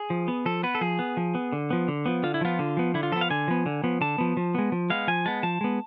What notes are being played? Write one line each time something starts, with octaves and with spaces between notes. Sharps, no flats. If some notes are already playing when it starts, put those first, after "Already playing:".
Already playing: G#4
F3
B3
F3 A4
B3 B4
A4
F3 G#4
B3
F3
B3
D3
F3 B3
D3
F3 B3
D3 F4
E4
F3 B3 F4
D3
F3 B3
D3 E4
F4
F3 B3 A4
F5
D3 G#5
F3 B3
D3
F3 B3
D3 A5
F3 B3
F3
G#3 B3
F3
G#3 B3 F5
F3 G#5
G#3 B3 A5
F3 A5
G#3 B3